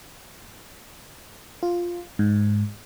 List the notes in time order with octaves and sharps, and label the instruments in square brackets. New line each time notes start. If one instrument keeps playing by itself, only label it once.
[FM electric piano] F4
G#2